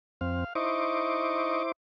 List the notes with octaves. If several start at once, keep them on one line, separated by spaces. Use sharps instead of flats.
F2 C4 F5
D#4 E4 C5 D#5 C#6 D6